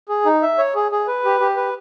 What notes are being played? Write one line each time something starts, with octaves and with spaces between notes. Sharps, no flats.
G#4
D#4
E5
C#5
G#4
G#4
B4
G4
G4
B4